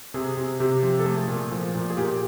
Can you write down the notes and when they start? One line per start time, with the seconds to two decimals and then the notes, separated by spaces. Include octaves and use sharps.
0.14 C3 G#4
0.37 C3
0.60 C3 G4
0.82 F3
0.99 A4
1.06 A3 G#4
1.28 A#2
1.52 F3
1.75 A#2
1.90 G#4
1.97 A#2 G4